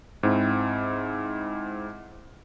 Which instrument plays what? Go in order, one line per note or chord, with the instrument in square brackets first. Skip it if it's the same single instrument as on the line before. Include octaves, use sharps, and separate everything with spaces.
[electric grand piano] G#2 C4 E4